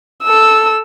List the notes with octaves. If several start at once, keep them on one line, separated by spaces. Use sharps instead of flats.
A4 E6